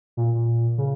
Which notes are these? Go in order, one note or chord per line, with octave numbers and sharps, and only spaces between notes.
A#2
C#3